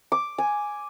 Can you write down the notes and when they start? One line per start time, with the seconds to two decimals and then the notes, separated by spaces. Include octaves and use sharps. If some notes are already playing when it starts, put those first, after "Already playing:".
0.12 D6
0.38 G#5